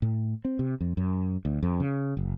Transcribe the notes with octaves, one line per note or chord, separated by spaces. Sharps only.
A2
C4
C3
F2
F#2
D2
F2
C#3
F#1